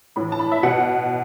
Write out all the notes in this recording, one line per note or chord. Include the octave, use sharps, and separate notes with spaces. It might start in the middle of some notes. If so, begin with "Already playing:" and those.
A2 E3 B5
A5
B5
E5
B2 F#5